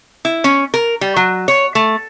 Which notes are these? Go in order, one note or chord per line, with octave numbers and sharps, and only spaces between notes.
E4
C#4
A#4
G3
F#3
C#5
A3